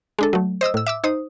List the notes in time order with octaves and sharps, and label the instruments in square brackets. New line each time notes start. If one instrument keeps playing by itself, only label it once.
[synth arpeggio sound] G#3 D4 A4
F#3 A3
C5 D#5 D#6 E6
A2 E6
E5 D6 E6
D#4 C5 D#6